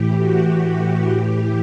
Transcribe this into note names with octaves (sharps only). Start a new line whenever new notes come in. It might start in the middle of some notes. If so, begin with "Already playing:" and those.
Already playing: A2 E3 G4
F#4
A2 E3 G4